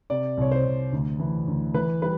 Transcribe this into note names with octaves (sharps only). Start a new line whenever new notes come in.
C3 D5
C2 C#5
C5
C2
D2
E3
D2
E3 B4
G3 B4